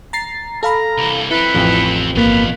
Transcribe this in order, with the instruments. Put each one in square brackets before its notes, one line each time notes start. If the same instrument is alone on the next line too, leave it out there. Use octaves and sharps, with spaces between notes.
[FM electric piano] A#5 A6 C7
[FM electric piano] A4 F5 B5 [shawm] A#5
[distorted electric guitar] C2 E3
[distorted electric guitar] C4 A4 [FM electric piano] E4 [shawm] B4
[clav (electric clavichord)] A1 F2
[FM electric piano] G1 A#3 [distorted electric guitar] B2 F5 [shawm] B4